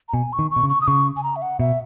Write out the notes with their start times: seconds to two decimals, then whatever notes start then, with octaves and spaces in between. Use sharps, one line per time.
0.09 A#5
0.14 B2 G#5
0.33 C#6
0.39 D#3
0.51 C#6
0.56 B2
0.63 C#3
0.69 C#6
0.81 D#6
0.87 C#3 C#6
1.17 G#5
1.23 A#5
1.36 E5
1.42 F#5
1.60 B2 E5